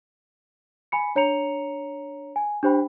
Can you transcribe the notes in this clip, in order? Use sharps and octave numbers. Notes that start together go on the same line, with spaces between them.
G#5 B5 C#7
D4 C#5 A#5 C#7 F7
G#5
D4 G4 C5 G5 B5